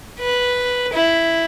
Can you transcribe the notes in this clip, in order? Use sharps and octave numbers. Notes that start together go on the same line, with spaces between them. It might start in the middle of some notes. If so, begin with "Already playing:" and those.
B4
E4